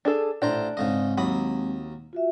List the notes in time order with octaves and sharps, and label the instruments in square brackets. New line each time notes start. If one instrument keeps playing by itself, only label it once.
[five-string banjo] D4 G#4 A4
[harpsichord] A1 C5 A#5 [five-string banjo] D4
[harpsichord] G#2 C#3 D#5 [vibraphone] G#3 C4
[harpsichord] D#2 B5 D#6 [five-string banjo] F#3
[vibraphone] F4 F#4 E5